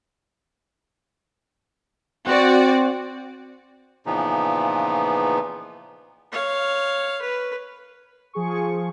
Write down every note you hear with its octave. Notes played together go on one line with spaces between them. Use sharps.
C4 F#4 D5
A#2 C#3 E3 F3 B3 D#4
C#5 F5
B4
F3 G#4 C#6